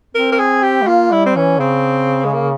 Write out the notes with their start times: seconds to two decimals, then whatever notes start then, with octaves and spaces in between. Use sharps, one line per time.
0.15 C4 A#4
0.32 A#4
0.39 G#4
0.63 G4
0.82 G#3
0.87 A#3 F4
1.11 G3 E4
1.26 C4
1.36 E3 C#4
1.60 C#3 C4
2.25 G#3
2.33 A#3